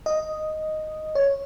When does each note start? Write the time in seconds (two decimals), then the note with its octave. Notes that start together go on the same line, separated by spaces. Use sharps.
0.06 D#5
1.15 C#5